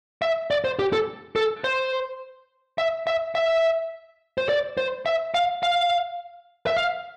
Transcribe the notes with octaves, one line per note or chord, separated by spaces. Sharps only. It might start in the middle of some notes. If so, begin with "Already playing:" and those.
E5
D5
C5
G4
A4
A4
C5
E5
E5
E5
C5
D5
C5
E5
F5
F5
E5
F5